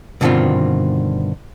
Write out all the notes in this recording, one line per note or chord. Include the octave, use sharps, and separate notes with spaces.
G2 B2 D3 D#3 C4 F4